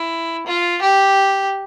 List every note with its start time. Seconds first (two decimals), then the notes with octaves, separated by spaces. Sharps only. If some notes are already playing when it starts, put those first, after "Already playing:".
Already playing: E4
0.47 F4
0.82 G4